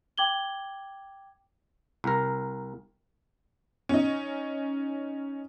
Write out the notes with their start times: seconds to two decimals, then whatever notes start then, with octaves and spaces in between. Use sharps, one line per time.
0.18 G5 D6 G#6 F#7 G7
2.04 C2 A#4
3.89 C#4 D#4